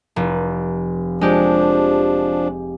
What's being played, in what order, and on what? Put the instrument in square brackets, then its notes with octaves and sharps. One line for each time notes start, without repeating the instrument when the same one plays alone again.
[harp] F1
[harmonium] F3 D4 [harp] G#3 G4